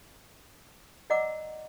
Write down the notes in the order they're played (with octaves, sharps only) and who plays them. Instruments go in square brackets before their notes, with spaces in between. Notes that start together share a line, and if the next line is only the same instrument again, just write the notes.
[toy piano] D5 D#5 F#5 A#5 D6 E6